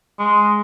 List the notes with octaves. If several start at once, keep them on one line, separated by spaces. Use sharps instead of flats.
G#3